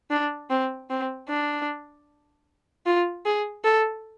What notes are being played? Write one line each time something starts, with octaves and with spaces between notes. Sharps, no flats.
D4
C4
C4
D4
F4
G#4
A4